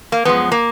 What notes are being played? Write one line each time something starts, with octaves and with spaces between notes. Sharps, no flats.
A#3
F#2 F3 G#3 B3
A#3